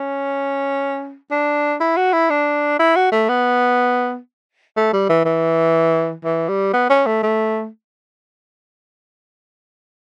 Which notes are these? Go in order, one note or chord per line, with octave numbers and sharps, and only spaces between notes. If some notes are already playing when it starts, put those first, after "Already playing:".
Already playing: C#4
D4
E4
F#4
E4
D4
E4
F#4
A3
B3
A3
G3
E3
E3
E3
G3
B3
C#4
A3
A3